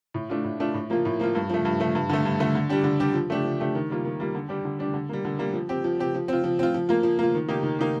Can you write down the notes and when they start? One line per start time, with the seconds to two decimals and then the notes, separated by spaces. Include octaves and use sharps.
0.14 A2
0.30 A3 D4 F4
0.44 A2
0.60 A3 D4 F4
0.74 A2
0.90 F3 A#3 F4
1.05 A2
1.20 F3 A#3 F4
1.35 G2
1.49 F3 A3
1.65 G2
1.80 F3 A3
1.95 G2
2.09 D3 A3
2.25 G2
2.40 D3 A3
2.55 D3
2.69 G3 D4 G4
2.84 D3
3.00 G3 D4 G4
3.14 F3
3.30 A3 D4 G4
3.44 F3
3.60 A3 D4 G4
3.75 D#3
3.90 G3 A#3 F4
4.05 D#3
4.20 G3 A#3 F4
4.35 D3
4.49 G3 D4 G4
4.65 D3
4.79 G3 D4 G4
4.94 D3
5.09 G3 A#3
5.25 D3
5.39 G3 A#3
5.53 F3
5.69 C4 G4
5.84 F3
6.00 C4 G4
6.14 F3
6.28 C4 F4
6.44 F3
6.59 C4 F4
6.74 F3
6.89 A#3 F4
7.03 F3
7.19 A#3 F4
7.34 D#3
7.48 A#3 D#4 G4
7.63 D#3
7.79 A#3 D#4 G4